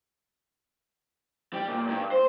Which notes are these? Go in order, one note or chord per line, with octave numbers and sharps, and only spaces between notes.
G3
A#2
G2
C5